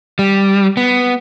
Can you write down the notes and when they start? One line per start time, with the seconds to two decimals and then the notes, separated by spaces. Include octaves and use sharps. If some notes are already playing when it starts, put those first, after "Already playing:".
0.19 G3
0.77 B3